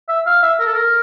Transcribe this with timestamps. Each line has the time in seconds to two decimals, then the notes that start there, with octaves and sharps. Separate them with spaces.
0.09 E5
0.26 F5
0.43 E5
0.60 A#4
0.67 A4
0.74 A#4